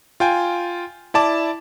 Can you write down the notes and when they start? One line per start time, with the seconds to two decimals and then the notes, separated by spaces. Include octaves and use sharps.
0.20 F4 G5 G#5
1.14 E4 D5 A5 D6